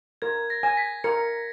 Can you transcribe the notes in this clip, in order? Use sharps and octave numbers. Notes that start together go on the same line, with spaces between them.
A#4 G#6
A#6
G#5
B6
A#4 C#7